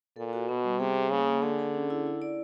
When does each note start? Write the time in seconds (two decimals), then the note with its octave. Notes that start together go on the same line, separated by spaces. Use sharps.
0.16 A#2 A4
0.33 F#4
0.48 B2 B3
0.64 G3
0.80 C3 G#4
0.96 G#4
1.12 C#3 A#3
1.28 A#3
1.42 D3 G#4
1.59 G#4
1.74 C#4
1.90 E4
2.07 E4
2.22 D5